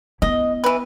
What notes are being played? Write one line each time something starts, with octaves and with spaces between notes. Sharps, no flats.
B3 E4 D#5
E3 B4